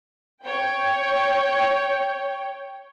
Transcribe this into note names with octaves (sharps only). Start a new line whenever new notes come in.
C#5 G5